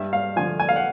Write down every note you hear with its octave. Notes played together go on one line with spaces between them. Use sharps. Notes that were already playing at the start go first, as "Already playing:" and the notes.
Already playing: G2 E5
F5
D3 F3 G#5
G#5
F5
F#5